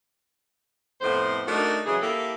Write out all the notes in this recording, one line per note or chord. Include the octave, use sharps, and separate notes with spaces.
F2 A2 B3 C5
A3 D4 D#4 F#4 A#4
C#3 E3 F#3 G#4
A#3 E4 G4 A4